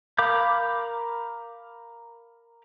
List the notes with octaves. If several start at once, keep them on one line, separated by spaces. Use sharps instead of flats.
A#4 F5 B5 D6 G6